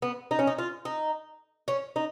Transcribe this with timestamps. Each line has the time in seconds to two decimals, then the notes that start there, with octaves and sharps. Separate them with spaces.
0.02 B3
0.31 D#4
0.39 C#4
0.47 D#4
0.58 F4
0.85 D#4
1.68 C#4
1.96 D#4